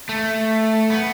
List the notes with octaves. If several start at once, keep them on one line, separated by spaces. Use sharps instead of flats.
A3
B3